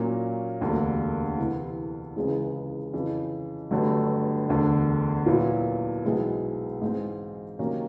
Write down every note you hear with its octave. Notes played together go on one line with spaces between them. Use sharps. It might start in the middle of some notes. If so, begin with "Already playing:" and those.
Already playing: A#2 F#3 A#3 C#4
E1 D2 D3 G3 A#3
C2 C3 E3
C#2 C#3 E3 G#3 C4
F2 C#3 E3
G1 G2 D3 F#3 A3
E1 D2 D3
A#2 F#3 B3 E4
B1 B2 G#3 C4 E4
G#2 E3 G#3 C4
C3 D#3 F#3 A#3 C#4